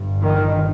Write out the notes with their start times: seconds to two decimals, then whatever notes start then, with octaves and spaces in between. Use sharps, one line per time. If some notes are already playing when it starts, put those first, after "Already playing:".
Already playing: G1 G2
0.22 D#3